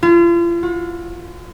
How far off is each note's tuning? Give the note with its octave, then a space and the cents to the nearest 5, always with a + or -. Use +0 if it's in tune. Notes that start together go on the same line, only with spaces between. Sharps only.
F4 -40
F4 +45